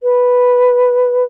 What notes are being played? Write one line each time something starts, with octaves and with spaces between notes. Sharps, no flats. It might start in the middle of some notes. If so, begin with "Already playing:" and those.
B4